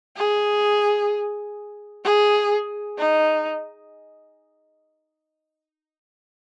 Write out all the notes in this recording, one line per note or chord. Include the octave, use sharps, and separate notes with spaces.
G#4
G#4
D#4